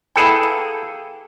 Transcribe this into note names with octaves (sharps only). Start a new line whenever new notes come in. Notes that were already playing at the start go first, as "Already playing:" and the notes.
E3 B3 E4 G#4 A4 G5
A#3